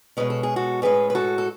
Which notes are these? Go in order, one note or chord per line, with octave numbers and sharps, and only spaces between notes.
B2 G#3 C#4 B4
A4
G#4
F#4 A4
A2 G#3 C#4 G#4 B4
B4
F#4 A4
A4